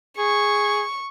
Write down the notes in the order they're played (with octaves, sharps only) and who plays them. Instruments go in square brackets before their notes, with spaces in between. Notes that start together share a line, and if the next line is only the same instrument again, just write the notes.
[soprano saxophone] G#4 [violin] C#6